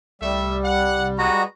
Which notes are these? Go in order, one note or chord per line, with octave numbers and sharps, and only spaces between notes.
C2 G3 A3 E5
F#5
G#3 B3 F#4 A#5